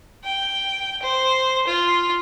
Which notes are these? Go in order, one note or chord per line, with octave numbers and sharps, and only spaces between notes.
G5
C5
F4